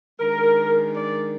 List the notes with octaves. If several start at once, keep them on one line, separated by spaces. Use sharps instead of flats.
D#3 G#3 D4 A#4
D5